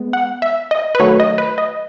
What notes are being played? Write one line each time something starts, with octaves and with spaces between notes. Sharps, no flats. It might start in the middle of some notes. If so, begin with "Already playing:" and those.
Already playing: G#3 B3
F#5
E5
D#5
B4
D#3 F#3 A3 C#5
D#5
B4
D#5